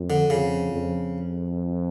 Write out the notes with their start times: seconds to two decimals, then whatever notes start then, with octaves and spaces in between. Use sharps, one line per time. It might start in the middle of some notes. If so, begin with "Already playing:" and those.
Already playing: F2
0.10 D3
0.30 F2 C#3
0.72 F2